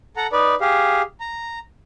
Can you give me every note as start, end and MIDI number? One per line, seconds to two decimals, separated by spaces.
0.17 0.27 69
0.17 0.27 78
0.17 0.27 82
0.32 0.55 63
0.32 0.55 71
0.32 0.55 74
0.61 1.02 67
0.61 1.02 68
0.61 1.02 77
1.20 1.59 82